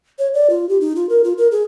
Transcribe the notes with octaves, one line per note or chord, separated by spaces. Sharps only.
C#5
D5
F4
G4
D#4
F4
A#4
F4
A#4
G#4